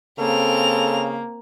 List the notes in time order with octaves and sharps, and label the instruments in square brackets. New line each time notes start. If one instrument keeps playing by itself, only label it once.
[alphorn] C#3 [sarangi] A#3 [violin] C4 F7 [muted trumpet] A4